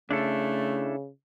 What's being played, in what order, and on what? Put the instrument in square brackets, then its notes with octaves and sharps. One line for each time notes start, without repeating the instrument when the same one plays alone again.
[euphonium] C#3 [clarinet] A3 [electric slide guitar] D4 E4 A4